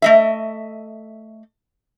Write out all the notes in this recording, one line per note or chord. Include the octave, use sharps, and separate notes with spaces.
A3 D#5 E5